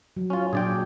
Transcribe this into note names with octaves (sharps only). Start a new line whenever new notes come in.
F#3
C#4 F4
A#2 F#3 D4 G#4 D5 G5